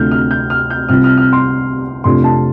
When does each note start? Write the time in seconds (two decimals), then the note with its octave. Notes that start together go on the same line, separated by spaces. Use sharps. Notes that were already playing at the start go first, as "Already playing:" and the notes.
Already playing: D2 C3 A3 D4 F4 F6 G6
0.11 F6
0.31 G6
0.50 F6
0.70 G6
0.89 C2 C3 G3 C4 F4 F6
1.04 F6
1.18 F6
1.33 C6
2.04 F2 C3 A3 D4 F4 C6
2.24 A5